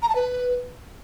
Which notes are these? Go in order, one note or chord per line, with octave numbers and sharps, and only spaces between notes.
A#5
A5
B4